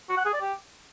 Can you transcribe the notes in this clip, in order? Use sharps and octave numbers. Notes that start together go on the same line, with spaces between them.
F#4
F#5
G#4
D5
G4